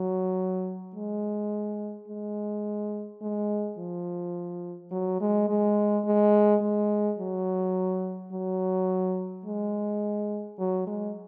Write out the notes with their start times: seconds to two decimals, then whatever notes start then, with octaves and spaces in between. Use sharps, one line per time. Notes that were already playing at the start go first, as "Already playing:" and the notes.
Already playing: F#3
0.94 G#3
2.08 G#3
3.21 G#3
3.78 F3
4.91 F#3
5.20 G#3
5.49 G#3
6.05 G#3
6.61 G#3
7.18 F#3
8.32 F#3
9.45 G#3
10.59 F#3
10.87 G#3